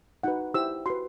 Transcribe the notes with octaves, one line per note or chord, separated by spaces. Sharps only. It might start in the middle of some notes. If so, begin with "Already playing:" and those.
D#4 F#4 B4 F#5
E4 G4 C5 E6
F#4 B4 C6